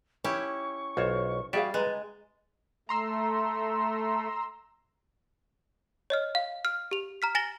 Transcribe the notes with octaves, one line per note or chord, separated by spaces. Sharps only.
C#4 E4 G4 C#6
B1 F4 C5 C#5
G3 F#4 G#4 D5 E5 F5 A6
G#3 B4 A#5
A3 A#5 C6 E6
C#5 D#5 F6
F5
F6
G4 F7
A#5 F6 B6
G#5 A6 A#6 E7 F#7 G7